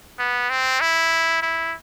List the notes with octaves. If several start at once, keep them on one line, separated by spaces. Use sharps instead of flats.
B3
C4
E4
E4